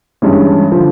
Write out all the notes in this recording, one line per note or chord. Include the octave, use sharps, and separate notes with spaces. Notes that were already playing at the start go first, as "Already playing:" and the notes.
G2 E3 G#3 C#4
D3 F3